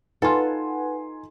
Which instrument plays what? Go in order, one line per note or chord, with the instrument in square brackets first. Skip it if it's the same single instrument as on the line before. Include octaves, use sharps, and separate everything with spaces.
[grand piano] D#4 G#5 C6 [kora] F4 A4 [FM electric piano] B4 F#5